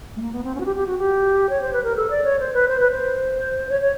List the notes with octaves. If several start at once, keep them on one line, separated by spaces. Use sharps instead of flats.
A3
A#3
B3
C4
C#4
F#4
G4
G4
F#4
G4
C#5
C5
B4
A#4
A4
D5
C#5
C5
B4
C5
B4
C5
C#5
C#5